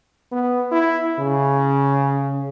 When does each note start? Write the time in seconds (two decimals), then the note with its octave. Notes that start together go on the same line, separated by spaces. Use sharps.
0.32 B3
0.71 E4
1.19 C#3